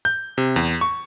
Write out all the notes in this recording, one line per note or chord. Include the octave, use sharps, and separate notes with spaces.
G6
C3
E2
C#6